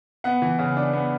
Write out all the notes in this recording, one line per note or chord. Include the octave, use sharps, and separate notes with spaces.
B3 F#5
E3
C#3
D4
B3